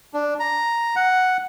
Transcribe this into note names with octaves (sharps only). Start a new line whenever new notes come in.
D4
A#5
F#5